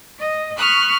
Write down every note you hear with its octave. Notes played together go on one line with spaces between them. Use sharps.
D#5
B5 C#6 D#6 F6 F#6